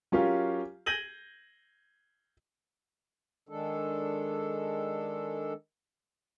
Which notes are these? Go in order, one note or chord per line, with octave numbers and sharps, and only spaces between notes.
F#3 C#4 F4 G4 A#4 F5
G6 G#6 A#6 D#7 F#7 G7
D#3 G#3 D4 A4